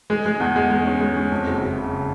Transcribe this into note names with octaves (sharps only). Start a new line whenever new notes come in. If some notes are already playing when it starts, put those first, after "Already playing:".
G#3
G#3
E2
G#3
G#3
C#4
G#3
C#4
F2
F#1
F#1
C#3